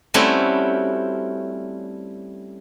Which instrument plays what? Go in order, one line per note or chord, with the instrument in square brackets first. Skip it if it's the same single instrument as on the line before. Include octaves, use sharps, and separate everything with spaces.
[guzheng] G3 A3 C4 C#4 E4 F#4